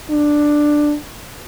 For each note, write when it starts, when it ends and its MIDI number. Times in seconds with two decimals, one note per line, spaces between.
0.11 0.95 62